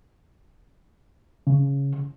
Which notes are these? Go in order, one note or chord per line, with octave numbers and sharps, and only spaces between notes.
C#3